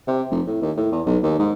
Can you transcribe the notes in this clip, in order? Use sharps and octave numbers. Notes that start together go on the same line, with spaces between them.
C3
F1
A2
D#2
A2
E2
B1
D#2
G#2